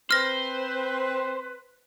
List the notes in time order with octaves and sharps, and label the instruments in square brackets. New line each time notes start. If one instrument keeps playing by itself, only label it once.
[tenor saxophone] C4 [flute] B4 [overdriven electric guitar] C5 [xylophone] F6 A#6